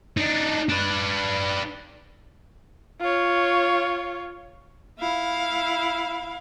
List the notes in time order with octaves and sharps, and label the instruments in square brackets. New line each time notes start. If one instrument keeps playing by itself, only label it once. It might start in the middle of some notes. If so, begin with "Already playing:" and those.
[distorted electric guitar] D4 D#4
D4 B4
[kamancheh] F4 C#5
[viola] E4 F5